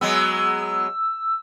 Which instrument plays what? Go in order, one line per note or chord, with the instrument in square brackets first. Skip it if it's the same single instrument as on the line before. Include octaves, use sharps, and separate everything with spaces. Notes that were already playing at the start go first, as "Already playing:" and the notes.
[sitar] F#3 G#3 B3 [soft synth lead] E6